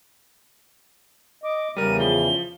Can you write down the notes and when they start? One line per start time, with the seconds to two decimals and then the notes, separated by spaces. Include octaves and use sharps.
1.43 D#5 D6
1.77 E2 C#3 G3 A#4 D#7
2.00 F3 G7